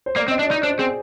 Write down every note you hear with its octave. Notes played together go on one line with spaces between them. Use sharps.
C5
A#3 D5
C4
D#5
D4
D#5
D5
D#4
D4 C5
C4 G#4